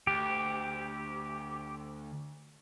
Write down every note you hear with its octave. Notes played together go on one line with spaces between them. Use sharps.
D2 G4